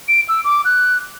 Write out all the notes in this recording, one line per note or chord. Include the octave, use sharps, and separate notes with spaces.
D7
E6
D6
F#6